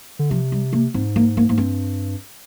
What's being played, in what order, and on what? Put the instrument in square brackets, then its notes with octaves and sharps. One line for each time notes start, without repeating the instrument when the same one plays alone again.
[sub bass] D3
[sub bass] C3 [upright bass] F3
[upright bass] G3
A#3
[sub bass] G#2 [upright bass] C4
[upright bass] A#3
A#3
[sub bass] G#2 [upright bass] A#3
[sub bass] G2 [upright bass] C4